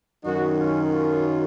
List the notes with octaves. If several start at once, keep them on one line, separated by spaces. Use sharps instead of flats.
F#2 D#3 F#3 D#4 F#4
C#4 F4
C#4 F4